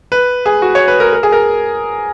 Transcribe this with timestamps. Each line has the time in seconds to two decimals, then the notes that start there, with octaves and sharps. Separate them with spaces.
0.12 B4
0.46 G#4
0.62 F#4
0.75 C#5
0.88 B4
1.00 A#4
1.13 A#4
1.23 G#4
1.32 A#4